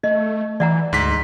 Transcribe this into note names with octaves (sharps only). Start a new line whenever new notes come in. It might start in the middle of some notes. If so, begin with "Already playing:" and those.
A3 D#5
E3 D5 F#5 A#5
D2 G#2 B6